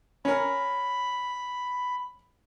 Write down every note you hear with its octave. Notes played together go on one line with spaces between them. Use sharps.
C#4 A#4 B5